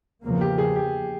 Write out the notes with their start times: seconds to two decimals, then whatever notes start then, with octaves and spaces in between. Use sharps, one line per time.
0.23 E2 C#3 F3 A#3
0.41 G4
0.58 G#4
0.76 G4